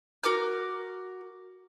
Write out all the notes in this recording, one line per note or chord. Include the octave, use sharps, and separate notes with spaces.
F#4 A#4 D6 F6